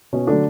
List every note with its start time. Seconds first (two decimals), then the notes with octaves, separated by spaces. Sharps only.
0.13 B2 C#4
0.27 D3 F#3 A3 D4